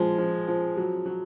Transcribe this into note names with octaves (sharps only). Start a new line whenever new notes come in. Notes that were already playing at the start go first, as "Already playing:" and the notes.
Already playing: F3 G#3
F3
F3
F#3
F#3